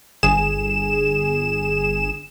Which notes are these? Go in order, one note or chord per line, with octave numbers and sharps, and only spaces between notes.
G1 G#4 E7